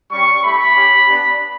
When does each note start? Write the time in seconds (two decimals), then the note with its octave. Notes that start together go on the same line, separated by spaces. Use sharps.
0.11 G3 C#4 G4 C#6
0.43 A3 E4 G4 B5
0.75 C#4 G4
1.08 B3 D4 G4